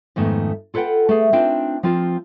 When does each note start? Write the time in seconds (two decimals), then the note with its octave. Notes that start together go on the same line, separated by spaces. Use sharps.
0.16 F2 G#2 D#3 A3 B3
0.74 F4 A4 B4 C#5 F#5 G5
1.09 A3 G#4
1.33 C4 D4 D#4 F4 B4 G5
1.83 F3 C4 F4 A#4